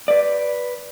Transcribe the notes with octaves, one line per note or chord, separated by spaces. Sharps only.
B4 D5